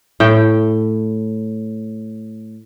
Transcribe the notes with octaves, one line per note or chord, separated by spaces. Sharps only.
A2 G5